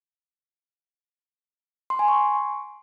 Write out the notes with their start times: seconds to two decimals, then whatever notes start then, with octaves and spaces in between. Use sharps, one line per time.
1.90 C6
1.99 G#5
2.08 C#6